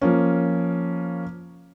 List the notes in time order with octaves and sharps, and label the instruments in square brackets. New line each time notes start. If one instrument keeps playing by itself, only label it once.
[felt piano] F3 A#3 C#4